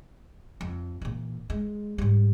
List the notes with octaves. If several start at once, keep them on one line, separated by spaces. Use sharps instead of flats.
F2
A#2 E3
G#3
G#2 G3